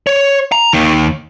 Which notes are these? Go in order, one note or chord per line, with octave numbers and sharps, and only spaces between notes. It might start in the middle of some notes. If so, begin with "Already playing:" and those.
C#5
A#5
D#2 D#3